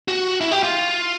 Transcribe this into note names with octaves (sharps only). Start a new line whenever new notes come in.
F#4
E4
G4
F4